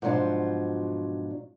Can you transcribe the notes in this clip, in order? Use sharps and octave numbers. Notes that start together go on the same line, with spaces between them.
G#2 B2 F3 F#3 D4 F4